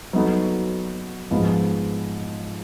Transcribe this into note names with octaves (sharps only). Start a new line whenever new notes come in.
F#3 B3 D#4 F#4 A4
G#2 F3 G#3 B3